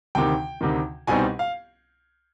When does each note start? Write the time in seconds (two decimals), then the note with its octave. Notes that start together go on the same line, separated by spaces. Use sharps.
0.15 D2 C3 D#3 G5
0.61 D2 C3 D#3
1.07 C2 B2 G3 C4 D#4 G#5
1.39 F5